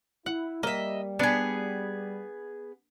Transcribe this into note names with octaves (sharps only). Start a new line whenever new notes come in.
E4 F#5
G3 A#3 D#5 E5
B3 D4 G#4